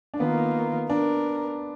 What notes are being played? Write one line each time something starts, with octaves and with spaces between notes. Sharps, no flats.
D4
D#3 A#3 B3 F4 A#4
D4 A#4